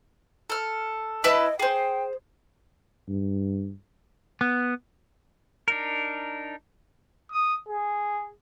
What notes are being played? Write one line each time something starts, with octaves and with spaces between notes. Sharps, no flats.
A4 F6
E4 B4 D#5 A5
G#4 C5 G5
G2
B3
D4 D#4 A#4
D#6
G#4